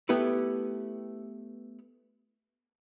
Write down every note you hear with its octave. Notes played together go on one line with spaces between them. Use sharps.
A3 B3 E4 G4 B4